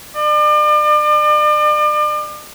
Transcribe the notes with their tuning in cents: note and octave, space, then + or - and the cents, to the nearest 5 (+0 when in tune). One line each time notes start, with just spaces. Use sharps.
D5 +40